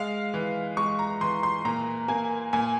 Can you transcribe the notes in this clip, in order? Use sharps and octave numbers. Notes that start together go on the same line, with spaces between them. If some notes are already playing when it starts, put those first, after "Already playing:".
Already playing: G#3 F5
E3
G#3 C#6
A#5
E3 C6
C6
A#2 A#5
A#3 G#5
A#2 G#5